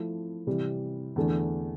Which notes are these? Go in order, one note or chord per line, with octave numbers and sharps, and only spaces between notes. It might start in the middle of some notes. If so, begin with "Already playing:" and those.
Already playing: F3 A3 E4
C3 E3 G3
E2 D3 A3